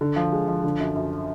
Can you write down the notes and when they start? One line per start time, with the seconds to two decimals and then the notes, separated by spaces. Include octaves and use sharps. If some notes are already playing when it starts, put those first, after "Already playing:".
0.01 D3
0.16 F3
0.32 G#3
0.48 F3
0.64 D3
0.80 F#2
0.96 F#2